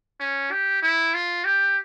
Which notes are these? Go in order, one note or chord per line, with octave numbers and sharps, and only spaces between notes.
C#4
G4
E4
F4
G4